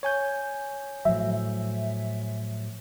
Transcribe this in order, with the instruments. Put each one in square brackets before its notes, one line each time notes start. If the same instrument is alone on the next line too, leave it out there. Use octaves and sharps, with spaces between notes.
[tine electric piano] C#5 G#5 G6
[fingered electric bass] A2 F3 F#3 [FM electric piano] E5